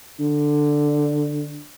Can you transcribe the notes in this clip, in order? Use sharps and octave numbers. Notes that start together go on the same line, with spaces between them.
D3